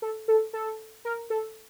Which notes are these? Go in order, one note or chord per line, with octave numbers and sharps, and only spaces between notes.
A4
A4
A4
A#4
A4